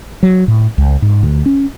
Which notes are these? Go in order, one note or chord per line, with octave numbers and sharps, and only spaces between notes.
F#3
A2
C#2
G#2
D2
C#4